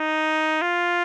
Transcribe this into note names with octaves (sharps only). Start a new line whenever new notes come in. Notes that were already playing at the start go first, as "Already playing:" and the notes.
Already playing: D#4
F4